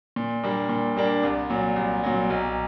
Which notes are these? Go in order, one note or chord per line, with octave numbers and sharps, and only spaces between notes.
A#2
G3 A#3 D4
A#2
G3 A#3 D4
C2
A#2 F#3
C2
A#2 F#3
B1